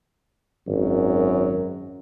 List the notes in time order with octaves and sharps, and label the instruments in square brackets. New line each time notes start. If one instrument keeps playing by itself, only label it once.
[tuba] G#1 [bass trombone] F#2